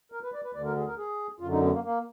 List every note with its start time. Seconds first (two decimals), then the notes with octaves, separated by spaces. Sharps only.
0.12 A#4
0.23 B4
0.33 D5
0.44 B4
0.54 D2 D5
0.57 D3
0.65 A#4
0.77 G#4
0.87 A#4
0.97 G#4
1.40 F#2 D3 F4
1.51 D#4
1.62 B3
1.72 A#3
1.84 A#3